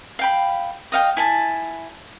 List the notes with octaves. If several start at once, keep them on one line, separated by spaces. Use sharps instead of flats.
F5 G5 B5
D#5 F5 G5
E4 G#5 A5